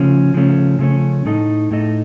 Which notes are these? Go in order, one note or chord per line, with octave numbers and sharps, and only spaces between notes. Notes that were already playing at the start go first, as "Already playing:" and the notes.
Already playing: C#3 F3 A3 C#4
C#3 F3 A3 C#4
C#3 F3 A3 C#4
A2 A3 D#4 A4 D#5
A2 A3 D#4 A4 D#5